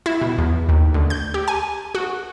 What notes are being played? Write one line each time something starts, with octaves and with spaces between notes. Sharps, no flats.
E4
B2
E2
D#2
D2
G6
G4
G#5
F#4